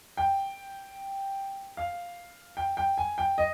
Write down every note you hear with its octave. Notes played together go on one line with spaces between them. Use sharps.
G5
F5
G5
G5
G#5
G5
D#5